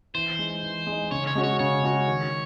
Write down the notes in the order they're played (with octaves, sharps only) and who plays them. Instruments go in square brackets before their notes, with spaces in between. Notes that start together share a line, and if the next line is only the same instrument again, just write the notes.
[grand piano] E3 [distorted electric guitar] C5
[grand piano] G#3 D#4
E3
G#3
D#4
[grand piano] C#3 [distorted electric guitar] C#5
[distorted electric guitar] C#5
[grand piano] G#3 C#4 F#4
[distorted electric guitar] C#5
[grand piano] C#3 [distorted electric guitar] C#5
[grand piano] G#3 C#4 F#4
D#3